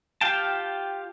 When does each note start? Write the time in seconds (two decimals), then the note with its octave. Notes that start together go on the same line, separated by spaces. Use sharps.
0.21 F4 G4 F5 G5 A5